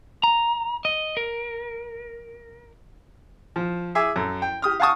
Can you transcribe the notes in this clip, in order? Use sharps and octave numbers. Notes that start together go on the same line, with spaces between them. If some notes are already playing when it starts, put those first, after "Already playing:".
A#5
D#5
A#4
F3
G#4 E5 G#5 D6
F#2 A4
G5
G4 D#6 F6
F5 F#5 G#5 A5 C#6 D#6